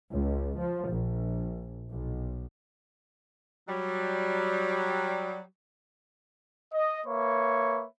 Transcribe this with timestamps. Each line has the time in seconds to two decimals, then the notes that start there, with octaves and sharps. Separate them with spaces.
0.11 C#2
0.58 F3
0.89 A#1
1.90 B1
3.68 F#3 G3
6.73 D#5
7.07 A#3 B4 C#5 E5